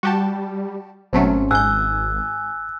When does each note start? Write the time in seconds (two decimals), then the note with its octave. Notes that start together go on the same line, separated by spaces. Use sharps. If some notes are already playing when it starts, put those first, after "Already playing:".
0.03 G3 F#4 G4 A5
1.13 G#1 B2 F#3 A3 C4 C#4
1.51 G#2 G#5 E6 F#6 G6